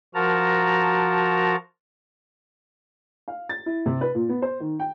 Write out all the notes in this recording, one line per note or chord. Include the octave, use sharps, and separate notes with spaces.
F3 F#4 A#4 A5 A#5
F5
A6
E4
C3
B4
A#2
B3
C5
D#3
G5